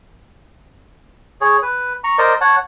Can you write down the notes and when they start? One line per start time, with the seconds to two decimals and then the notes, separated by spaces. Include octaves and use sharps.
1.41 G#4 C#5
1.62 B4
2.04 A#5 C#6
2.18 A#4 C5 D5 D#5
2.41 C#5 F#5 A5